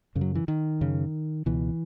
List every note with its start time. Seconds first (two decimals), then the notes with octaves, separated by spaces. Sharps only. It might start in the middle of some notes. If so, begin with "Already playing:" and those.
0.15 F#2 C#3
0.21 F#3
0.35 E3
0.48 D#3
0.81 F#2 C#3
1.46 C#2 B2 E3